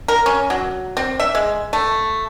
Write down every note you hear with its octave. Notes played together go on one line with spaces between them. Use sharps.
A#4
C#4
F#3
C4
E5
G#3
A3